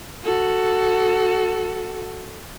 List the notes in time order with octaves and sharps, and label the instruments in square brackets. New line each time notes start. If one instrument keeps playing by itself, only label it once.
[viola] F#4 A4